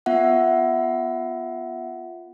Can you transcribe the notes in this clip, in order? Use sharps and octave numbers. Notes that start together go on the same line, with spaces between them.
B3 F4 E5 F#5